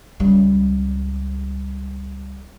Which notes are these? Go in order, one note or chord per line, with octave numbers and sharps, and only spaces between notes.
C#2 G3